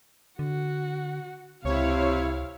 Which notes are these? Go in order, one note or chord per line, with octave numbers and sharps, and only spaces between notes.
D3 F#4
C#2 C3 E4 C#5 F5